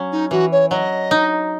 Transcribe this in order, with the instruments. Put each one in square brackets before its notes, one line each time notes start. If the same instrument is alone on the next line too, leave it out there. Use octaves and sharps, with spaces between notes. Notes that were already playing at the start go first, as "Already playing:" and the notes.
Already playing: [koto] F#3 C#4
[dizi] D#4
[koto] E3 [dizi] F#4
[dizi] C#5
[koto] F#3 [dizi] D#5
[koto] D#4